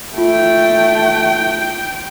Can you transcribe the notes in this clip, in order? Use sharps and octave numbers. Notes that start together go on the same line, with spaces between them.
A3 F4 G5